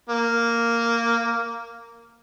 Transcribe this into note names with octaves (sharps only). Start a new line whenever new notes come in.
A#3